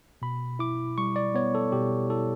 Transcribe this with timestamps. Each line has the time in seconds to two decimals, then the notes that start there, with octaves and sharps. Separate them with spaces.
0.22 B2 B5
0.59 E4 D6
0.98 G3 C#6
1.16 D5
1.35 B3 C#5
1.55 A4
1.72 B2 G4
2.10 E4 A4